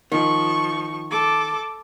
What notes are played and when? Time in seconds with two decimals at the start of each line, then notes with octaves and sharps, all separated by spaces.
0.12 D#3 F3 C#6
1.11 A4 D6